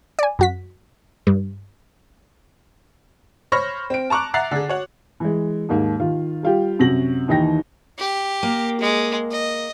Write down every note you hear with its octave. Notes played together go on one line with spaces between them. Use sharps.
D5 G#5
F#2 F#4 B6
G2
C5 C#5 B5 C#6 F6 A#6
C4 D7
A5 A#5 C#6 D6 F#6
E5 F#5 A#5 F#6 A6 C7
D3 G#4
F#4 C#5 F#5
E3 G#3
D#2 G#2 A#3
D#3 F4
G3 F4 G4
F#2 C3 F#4 A#6 F#7
D#2 D#3 E3 D#4 G5 A#6
G4
A#3
G#3
D#5